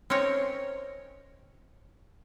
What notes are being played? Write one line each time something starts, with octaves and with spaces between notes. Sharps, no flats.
C4 C#4 D#4 A#4 C#5